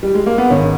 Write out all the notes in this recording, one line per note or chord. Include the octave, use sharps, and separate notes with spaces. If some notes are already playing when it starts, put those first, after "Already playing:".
G3
G#3
A#3
B3
G#1 C#4